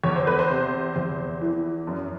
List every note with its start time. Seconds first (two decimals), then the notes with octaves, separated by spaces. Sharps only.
0.03 E2 C#5
0.16 C5
0.27 B4
0.39 C5
0.50 C3
0.96 E2
1.41 E3
1.87 F#2